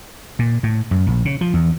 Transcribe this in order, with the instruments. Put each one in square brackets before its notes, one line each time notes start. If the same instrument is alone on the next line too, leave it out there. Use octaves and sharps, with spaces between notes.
[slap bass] A#2
A2
F#2
A#1
C#3
F3
E2